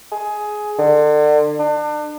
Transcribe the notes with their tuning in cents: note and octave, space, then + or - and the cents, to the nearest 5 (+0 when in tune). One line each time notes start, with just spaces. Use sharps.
G#4 +15
D3 +35
D4 +35